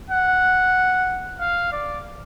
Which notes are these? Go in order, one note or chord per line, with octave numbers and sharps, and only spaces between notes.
F#5
F5
D5